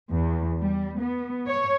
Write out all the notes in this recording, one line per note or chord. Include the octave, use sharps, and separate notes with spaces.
E2
G3
B3
C#5